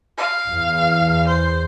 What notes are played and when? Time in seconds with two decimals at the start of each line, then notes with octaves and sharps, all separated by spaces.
0.17 F5
0.51 E2
1.27 C5